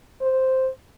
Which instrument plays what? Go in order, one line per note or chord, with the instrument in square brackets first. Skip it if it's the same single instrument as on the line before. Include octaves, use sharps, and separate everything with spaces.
[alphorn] C5